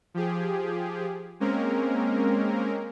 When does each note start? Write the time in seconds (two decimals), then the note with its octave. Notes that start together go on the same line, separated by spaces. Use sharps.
0.14 F3 G4 G#4
1.40 G#3 A#3 C4 C#4 A#4